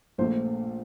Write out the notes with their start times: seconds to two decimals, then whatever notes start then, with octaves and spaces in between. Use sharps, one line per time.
0.18 A#1 A#2 A3 C5